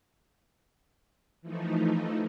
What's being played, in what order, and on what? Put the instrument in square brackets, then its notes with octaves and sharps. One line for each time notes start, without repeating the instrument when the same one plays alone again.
[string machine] E3 F3 A3 D#4